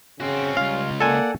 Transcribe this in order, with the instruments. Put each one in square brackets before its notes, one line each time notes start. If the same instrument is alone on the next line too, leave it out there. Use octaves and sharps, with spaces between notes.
[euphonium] C#3 [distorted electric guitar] C4 F#4 [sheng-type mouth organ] C#4
[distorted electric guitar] C#2 F4 [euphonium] G3 [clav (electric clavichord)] F5
[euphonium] A#3 [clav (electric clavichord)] A4 G#5 [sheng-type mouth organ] D5 F#5